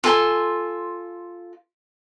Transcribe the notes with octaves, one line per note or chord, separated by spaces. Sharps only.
F4 A4 G#5 C6